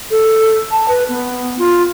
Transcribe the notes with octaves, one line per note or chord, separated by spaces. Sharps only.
A4
A5
B4
B3
F4